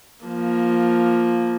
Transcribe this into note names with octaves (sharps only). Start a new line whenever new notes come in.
F3 A#3